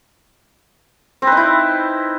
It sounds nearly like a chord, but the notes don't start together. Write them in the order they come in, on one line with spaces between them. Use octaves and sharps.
C4 B4 D#4 E4